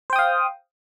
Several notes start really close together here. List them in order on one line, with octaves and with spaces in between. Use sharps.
C5 G5 D#6 F5